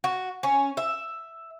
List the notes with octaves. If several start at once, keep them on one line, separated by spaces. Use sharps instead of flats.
F#4
C#4
E5